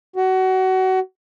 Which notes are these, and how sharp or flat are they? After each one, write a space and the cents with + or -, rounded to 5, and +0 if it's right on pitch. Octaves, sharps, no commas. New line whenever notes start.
F#4 +25